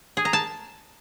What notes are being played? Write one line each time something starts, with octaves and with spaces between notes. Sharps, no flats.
G#4
A#5
A5